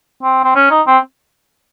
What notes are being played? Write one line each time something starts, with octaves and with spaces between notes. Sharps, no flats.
C4
C4
C#4
D#4
C4